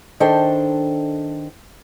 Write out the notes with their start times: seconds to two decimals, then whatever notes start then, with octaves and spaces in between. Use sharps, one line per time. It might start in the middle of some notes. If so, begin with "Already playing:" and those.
0.20 D#3 D4 A4 C5 G5